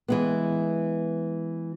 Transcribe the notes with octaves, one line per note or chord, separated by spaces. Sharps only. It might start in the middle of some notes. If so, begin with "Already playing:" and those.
E3 G#3 B3